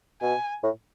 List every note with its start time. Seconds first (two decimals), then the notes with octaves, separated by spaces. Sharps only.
0.22 B2 G#5
0.63 A2